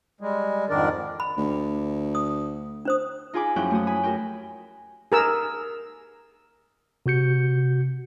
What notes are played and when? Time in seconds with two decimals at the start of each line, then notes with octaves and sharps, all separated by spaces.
0.21 G3 G#3
0.69 F2 G#2 D#3 D4 A#4 D5
1.20 B5
1.38 D2
2.15 D#6
2.85 D4 C5 D#6
3.33 D#4 F4 G#4 G#5 B5 D6
3.56 F#2 F3 C#4 E4 G5 F#6
3.71 A3 F#4 D#6
3.87 G#5 B5 D#6
4.03 F#4 G4 A#4 B4 G5
5.12 G#4 A#4 E6
7.06 C3 F#4 G6 C#7